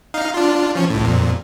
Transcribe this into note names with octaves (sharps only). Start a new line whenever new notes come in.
D#4 F5
D4 F4
F3 C#4
C#2 A2
F2 A#2